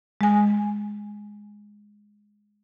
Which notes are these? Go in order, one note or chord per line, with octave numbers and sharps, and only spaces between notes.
G#3 G#5